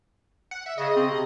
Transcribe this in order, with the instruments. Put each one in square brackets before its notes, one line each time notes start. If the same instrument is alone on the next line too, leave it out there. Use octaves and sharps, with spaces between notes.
[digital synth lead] F#5
E5
[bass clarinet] C#3 [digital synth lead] D#5
[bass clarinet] C4
C3